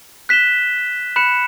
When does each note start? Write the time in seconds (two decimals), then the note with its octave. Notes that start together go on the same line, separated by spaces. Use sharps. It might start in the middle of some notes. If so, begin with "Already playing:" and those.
0.29 F#6 B6 E7 G7
1.16 B5 F#6 C#7 E7